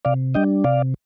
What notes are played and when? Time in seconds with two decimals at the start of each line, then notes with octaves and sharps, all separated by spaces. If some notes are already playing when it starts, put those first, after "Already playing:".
0.05 C3 D5 F5
0.34 G3 D4 D#5 G5
0.64 C3 D5 F5